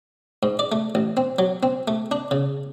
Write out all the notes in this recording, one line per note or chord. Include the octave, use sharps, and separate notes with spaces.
G#2
D5
A3
A1
C4
F#3
C4
A3
D4
C#3